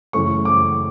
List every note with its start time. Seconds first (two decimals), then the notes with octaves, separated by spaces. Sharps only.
0.13 F#2 C#3 E3 A3 C#4 C#6
0.45 D6